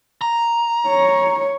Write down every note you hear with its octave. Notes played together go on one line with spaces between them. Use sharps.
A#5
C#5